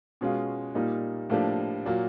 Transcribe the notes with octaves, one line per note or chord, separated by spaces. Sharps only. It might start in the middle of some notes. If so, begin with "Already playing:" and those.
B2 G#3 C#4 F4
A#2 G3 A#3 D#4
A2 F3 A#3 D4 G4
A#2 F#3 A#3